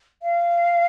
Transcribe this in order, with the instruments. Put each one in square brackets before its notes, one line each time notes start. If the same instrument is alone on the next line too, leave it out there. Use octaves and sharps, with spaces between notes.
[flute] F5